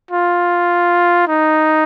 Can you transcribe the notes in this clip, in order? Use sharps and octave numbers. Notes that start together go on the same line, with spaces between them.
F4
D#4